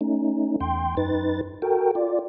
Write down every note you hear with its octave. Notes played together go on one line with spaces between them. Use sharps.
A3 C#4 D#4
E2 G5 C6
F#2 D#4 B4 A6
F#4 A4 A#4 G5
F4 D5